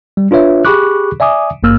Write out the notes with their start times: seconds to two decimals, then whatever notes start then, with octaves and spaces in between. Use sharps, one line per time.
0.17 G3
0.31 D4 F4 B4 C#5 E5
0.65 G4 G#4 B5 C#6 D6 F#6
1.20 D5 E5 G#5 D6 D#6
1.63 G#1 G2 A#3 E6 F6